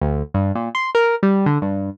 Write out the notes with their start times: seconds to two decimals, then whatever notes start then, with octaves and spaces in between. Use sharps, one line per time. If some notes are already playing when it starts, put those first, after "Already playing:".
0.01 D2
0.34 G2
0.55 A#2
0.75 C6
0.95 A#4
1.23 G3
1.46 D3
1.62 G2